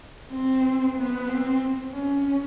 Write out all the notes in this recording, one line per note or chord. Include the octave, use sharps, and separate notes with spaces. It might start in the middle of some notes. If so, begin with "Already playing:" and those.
C4
B3
C4
C#4